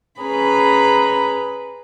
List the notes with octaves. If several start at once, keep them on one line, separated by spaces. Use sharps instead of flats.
C#4 G#4 B4 A#5 B5